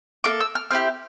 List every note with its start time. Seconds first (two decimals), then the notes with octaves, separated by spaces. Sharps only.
0.24 A#3 F4 A4 D6
0.40 E6
0.55 F6
0.71 C4 E4 G4 F6